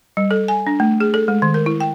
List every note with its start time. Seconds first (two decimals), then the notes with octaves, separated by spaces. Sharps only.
0.17 G3
0.31 A4
0.48 G#5
0.67 D4
0.80 A3
1.00 G#4
1.14 A4
1.28 G#3
1.42 D#3
1.54 A#4
1.66 E4
1.80 G5